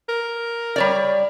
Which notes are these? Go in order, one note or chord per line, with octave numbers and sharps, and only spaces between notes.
A#4
G3 C#5 D5